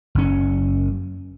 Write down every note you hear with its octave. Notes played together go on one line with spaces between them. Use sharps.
F#1 C#4